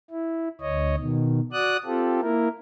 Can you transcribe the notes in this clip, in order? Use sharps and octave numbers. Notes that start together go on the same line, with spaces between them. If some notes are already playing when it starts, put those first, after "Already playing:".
E4
D2 C#5 D#5
B2 D#3
F#4 D5 D#6 F#6
C4 F4 G4 A4
A#3 E4 A#4